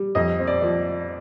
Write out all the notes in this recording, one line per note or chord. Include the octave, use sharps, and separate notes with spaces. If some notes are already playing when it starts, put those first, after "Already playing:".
Already playing: G3
F2 D#5
C4
D5
F3